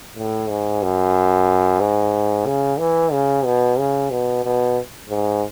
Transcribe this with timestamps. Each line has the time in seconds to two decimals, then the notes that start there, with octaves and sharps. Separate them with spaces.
0.16 A2
0.48 G#2
0.82 F#2
1.80 G#2
2.46 C#3
2.79 E3
3.12 C#3
3.45 B2
3.78 C#3
4.11 B2
4.44 B2
5.09 G#2